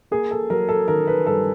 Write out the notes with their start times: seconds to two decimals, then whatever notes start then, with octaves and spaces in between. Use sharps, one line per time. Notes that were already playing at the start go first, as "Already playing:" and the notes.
0.11 A#3 G#4
0.31 A4
0.50 F#3 A#4
0.69 A4
0.88 D#3 A#4
1.07 B4
1.26 G2 A4